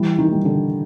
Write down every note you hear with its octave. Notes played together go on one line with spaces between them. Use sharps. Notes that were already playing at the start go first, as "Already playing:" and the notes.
Already playing: E3 G3
D#3
G3
D3